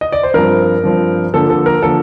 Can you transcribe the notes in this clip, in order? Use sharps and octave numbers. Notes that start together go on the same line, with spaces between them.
D#5
D5
C5
G2 F3 C4 A#4
G2 F3 C4
D3 F3 A#3 A4
A4
A#4
D3 F3 A#3 A4